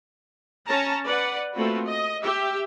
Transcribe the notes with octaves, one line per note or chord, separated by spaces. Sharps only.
C#4 A5 A#5
B4 D5 F#5
A3 A#3 C4 F4 F#4 B4
D#5
G4 E5